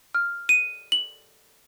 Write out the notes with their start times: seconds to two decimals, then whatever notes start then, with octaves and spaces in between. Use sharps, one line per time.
0.15 F6
0.49 D#7
0.92 F#7